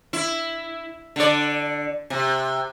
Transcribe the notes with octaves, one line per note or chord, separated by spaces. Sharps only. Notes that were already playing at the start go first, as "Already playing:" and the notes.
E4
D3 D5
C3